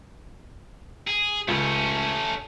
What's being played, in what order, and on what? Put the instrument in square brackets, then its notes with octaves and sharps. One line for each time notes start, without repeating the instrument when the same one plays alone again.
[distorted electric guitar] G#4
[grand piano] C#2 [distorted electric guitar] A3 C#4